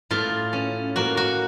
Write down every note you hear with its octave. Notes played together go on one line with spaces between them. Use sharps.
A2 F4
C#4
A#3 F#4
F#4